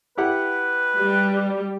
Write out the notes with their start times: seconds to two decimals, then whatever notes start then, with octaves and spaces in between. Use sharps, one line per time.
0.18 E4 G4 B4 F#5
0.96 G3